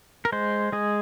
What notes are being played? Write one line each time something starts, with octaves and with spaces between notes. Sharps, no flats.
A#4
G#3 C5
G#3 G#4